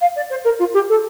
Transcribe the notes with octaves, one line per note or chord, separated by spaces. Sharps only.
F5
D5
C5
A#4
F4
G4
A4